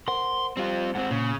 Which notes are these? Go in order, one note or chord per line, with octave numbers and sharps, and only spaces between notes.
A#4 C5 F#5 C6
G3 C4 F4 G4
G#2 C4 F#5
A#2 C#3